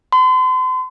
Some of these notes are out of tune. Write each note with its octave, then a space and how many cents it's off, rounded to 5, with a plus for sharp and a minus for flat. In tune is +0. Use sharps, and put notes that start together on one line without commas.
C6 -40